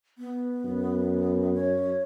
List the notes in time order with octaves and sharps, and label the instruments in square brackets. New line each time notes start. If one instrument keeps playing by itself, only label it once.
[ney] B3
[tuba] F#2
[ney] C#5